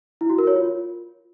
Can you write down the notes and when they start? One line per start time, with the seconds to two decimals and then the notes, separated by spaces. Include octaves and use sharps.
0.21 E4
0.30 F#4
0.38 A#4
0.47 C#5
0.56 F4